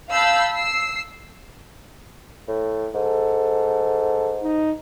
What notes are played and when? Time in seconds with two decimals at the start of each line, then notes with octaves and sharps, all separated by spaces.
0.12 F5 A5 B5 E6 G6 C7
0.53 E6 C7
2.48 A2
2.94 G#2 A4
4.43 D#4